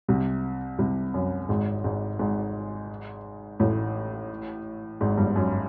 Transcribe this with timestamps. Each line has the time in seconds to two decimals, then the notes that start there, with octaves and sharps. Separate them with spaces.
0.08 C2 C3
0.78 C2 C3
1.14 F#2
1.49 G#1 G#2
1.84 G#1 G#2
2.19 G#1 G#2
3.60 A1 A2
5.01 G#1 G#2
5.17 G1 G2
5.36 F#2